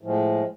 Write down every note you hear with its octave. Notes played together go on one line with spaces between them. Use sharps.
A2 F3 G#3